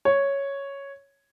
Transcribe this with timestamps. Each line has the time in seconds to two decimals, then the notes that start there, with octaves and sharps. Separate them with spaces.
0.05 C#5